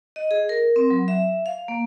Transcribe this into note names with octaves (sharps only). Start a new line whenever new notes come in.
D#5
G#4
A#4
C4
F#3
E5
F5
A#3